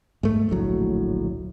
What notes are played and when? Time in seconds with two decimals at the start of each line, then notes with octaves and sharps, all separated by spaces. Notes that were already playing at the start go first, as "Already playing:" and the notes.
0.23 G#2 A3
0.49 D1 A#1 A2 F#3